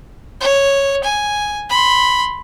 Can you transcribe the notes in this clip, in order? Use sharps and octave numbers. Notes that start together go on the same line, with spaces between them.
C#5
G#5
B5 C6